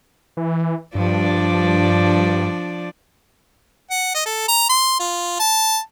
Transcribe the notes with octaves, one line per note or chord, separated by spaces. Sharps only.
E3
G2 F3 D4 D5
F#5
D#5
A4
A#5
C6
F4
A5